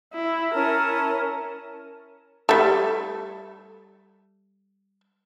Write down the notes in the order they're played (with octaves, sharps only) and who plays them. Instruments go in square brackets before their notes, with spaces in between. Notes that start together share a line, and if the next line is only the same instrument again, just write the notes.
[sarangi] E4
[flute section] C#4 E4 A5 [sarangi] A#4
[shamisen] G3 A3